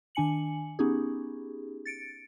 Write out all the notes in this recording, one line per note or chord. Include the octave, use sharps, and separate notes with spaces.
D#3 D4 G#5 C#7 F#7
B3 C#4 D#4 G4 G#4
A6 C#7 D7